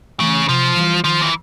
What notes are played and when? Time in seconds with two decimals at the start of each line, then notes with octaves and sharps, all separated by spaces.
0.20 C#3 E3 A3
0.49 C3 F3
0.77 E3 G3
1.04 D#3 F3
1.22 E3